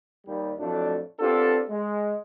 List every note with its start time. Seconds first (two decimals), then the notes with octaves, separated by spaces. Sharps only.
0.26 D#2 G3
0.59 F2 A2 F#3 A3 D4
1.20 B3 C4 D4 F4 G4 A4
1.69 G#3